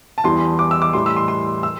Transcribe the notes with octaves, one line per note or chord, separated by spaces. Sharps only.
A5
E2 E3 G3 C6
D6
E6
D6
A2 E3 G3 C6
E6
C6
C6
E6